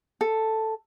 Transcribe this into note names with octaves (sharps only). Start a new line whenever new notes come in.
A4